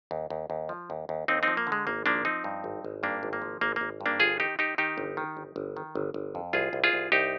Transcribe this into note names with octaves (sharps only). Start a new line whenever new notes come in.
D#2
D#2
D#2
F3
D#2
D#2
D#2 C4 D#4
F3 C4 D#4
A#3
D3
G#3
G#1 A#3
F3 A#3 D4
F3 C4 D#4
G2
G#1
G#1
G2 A#3 D4
G#1
A#3
F3
G#1 A#3
G#1 A#3
G2
A#3 D4
G1 F4 G#4
D#3 D#4 G4
D#3 D#4 G4
D#3 D#4 G4
G1
D#3
G1
G1
D#3
G1
G1
F2
C2 F4 G#4
C2
F4 G#4
C2
C2 D#4 G4